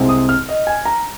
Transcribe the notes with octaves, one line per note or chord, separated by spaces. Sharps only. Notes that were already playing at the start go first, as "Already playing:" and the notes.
Already playing: C2 C3 G#3 C4
D#6
F6
D#5
G#5
A#5